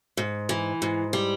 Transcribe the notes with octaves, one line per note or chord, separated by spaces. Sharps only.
G#2
E3
G#2
G3